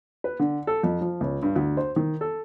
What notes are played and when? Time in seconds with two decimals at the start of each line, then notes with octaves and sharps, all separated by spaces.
0.24 B4
0.39 D3
0.67 A4
0.83 F2
1.01 F3
1.21 C#2
1.42 G2
1.56 D2
1.77 C5
1.96 D#3
2.21 A4